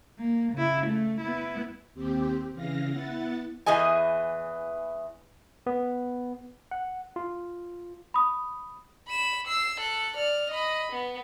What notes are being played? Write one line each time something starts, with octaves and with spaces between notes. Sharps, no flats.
A#3
C#3 E4
A3
B3 E4
D#2 C4 G4
C#3 E3 F5 A#6
B3 E4 F#5 A6
E2 E3 G#4 D#5 G#5
B3
F#5
F4
B5 D#6
B5 E7
E6 C7
A4 F#6
D5 F6
D#5 B5
B3